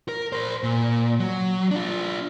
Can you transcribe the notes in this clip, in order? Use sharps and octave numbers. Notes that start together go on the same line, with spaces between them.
A#4
A#4 C5
A#2
F#3
D4 F4